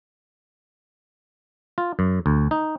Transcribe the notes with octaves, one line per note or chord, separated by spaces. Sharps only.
F4
F#2
D2
D#4